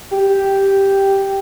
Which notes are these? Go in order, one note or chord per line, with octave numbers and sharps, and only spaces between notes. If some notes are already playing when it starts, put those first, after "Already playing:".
G4